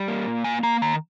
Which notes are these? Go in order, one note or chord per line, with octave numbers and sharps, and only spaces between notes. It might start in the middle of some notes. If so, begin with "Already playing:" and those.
Already playing: G3
A#3
A#2
A#3 G#5
A#3 A#5
D#3 A#5